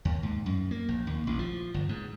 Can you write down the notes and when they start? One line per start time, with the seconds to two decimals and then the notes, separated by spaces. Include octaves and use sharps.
0.05 D#2
0.23 G#2
0.46 F#2
0.71 A#3
0.89 A#1
1.07 D#2
1.27 A1
1.39 F3
1.74 G1
1.89 G#2